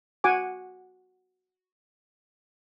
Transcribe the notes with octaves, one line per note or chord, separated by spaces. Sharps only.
F#4 F#5 G#5 D6